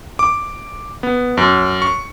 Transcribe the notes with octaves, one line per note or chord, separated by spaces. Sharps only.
D6
B3
F#2
C#6